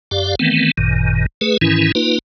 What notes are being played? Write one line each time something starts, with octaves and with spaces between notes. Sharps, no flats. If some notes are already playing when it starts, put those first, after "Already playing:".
F#2 G4 D5 F5
D#3 E3 A3 B3 C4
G#1 F#2 A#2 D#3
A3 G#4 B4
G#2 D#3 E3 C#4 E4
A#3 D#4 F4 B4